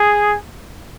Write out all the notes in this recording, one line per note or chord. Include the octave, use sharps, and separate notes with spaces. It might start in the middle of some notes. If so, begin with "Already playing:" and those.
Already playing: G#4